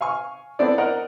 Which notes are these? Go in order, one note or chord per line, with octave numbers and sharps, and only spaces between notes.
F5 G#5 C#6
B3 C4 D4 E4 A4 D5
A#4 C5 D5 D#5 F#5 A#5